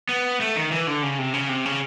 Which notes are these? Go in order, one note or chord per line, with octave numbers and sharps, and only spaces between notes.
B3
A3
D#3
E3
D3
C#3
C3
C#3
C3
C#3